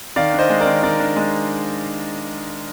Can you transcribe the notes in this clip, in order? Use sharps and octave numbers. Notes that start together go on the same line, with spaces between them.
D#3 D5 F5
D4
C5 D#5
G#3
A#4 D5
D#3
D#3 A#4 D5
D4
G#3